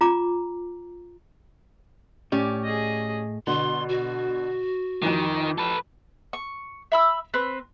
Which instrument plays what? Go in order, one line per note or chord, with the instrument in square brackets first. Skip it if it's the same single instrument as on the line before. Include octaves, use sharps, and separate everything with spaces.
[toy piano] F4 A#5 D6
[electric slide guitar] A2 [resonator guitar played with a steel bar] C#4 G4 D5
[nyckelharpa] G#4 D#5
[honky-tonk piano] B2 D3 [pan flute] C6
[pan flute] F#4
[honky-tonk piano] F2 E3 [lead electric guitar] D#3
[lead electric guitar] A4 B4
[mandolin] C#6
E5 B5 E6
C4 B4